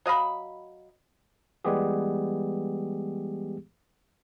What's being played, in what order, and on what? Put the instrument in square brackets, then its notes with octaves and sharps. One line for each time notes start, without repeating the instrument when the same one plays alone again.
[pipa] F#3 D#5 F5 B5
[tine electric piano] E3 G3 G#3 B3 G4 G#4